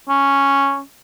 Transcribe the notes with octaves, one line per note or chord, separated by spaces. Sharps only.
C#4